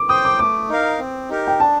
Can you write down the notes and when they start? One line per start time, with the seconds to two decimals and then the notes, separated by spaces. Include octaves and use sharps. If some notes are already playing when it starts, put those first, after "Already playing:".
Already playing: D6
0.09 C5 G5 D#6
0.25 D6
0.39 A3 D6
0.69 D#4 A#4 F5
1.00 C4
1.29 D#4 G4 A#4
1.47 G5
1.60 D4 A5